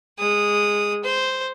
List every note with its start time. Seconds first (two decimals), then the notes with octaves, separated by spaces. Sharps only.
0.19 G#3 D#6
1.04 C5